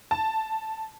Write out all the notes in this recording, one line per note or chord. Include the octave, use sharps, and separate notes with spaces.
A5